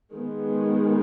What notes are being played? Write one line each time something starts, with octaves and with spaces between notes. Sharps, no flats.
D#3 G#3 B3